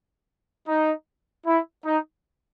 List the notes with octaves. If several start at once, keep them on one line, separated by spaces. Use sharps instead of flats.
D#4
E4
D#4